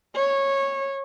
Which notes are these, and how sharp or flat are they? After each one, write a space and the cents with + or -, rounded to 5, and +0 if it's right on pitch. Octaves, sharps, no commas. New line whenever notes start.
C#5 -15